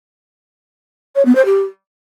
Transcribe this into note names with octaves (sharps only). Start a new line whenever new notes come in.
C#5
B3
C5
G4